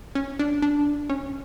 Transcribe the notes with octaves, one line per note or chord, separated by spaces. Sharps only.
C#4
D4
D4
C#4